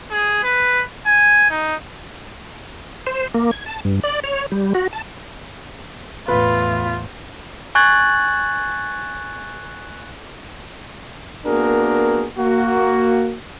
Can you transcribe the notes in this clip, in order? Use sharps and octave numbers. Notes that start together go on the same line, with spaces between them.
G#4
B4
G#5
D#4
C5
A#3
G#6
A5
G2
D5
C#5
G3
F#4
A5
E2 A2 F4 B4
G#5 C#6 F#6 G#6 A6 F#7
A#3 B3 D4 F#4 G#4 A#4
A#3 F#4